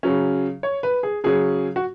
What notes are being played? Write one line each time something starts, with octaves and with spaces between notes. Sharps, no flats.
C#3 F#3 C#4
C#5
B4
G#4
C#3 F#3 C#4 G#4
F#4